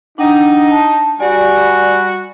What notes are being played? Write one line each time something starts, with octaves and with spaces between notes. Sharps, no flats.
D4 D#4 F#5 G5
A5
G3 F#4 D5 G#5